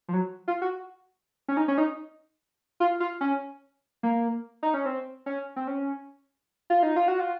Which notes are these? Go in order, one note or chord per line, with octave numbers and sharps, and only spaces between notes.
F3
F#3
F4
F#4
C#4
D#4
C#4
D#4
F4
F4
C#4
A#3
D#4
C#4
C4
C#4
C4
C#4
F4
D#4
F4
F#4
F4